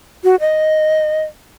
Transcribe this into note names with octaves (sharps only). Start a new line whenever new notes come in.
F#4
D#5